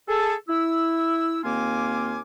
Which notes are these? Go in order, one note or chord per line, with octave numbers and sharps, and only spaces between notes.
G#4 A4
E4 E6
D#2 A#3 C4 F4 G#5 D6